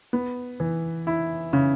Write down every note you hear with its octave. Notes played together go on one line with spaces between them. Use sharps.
B3
E3
E4
C#3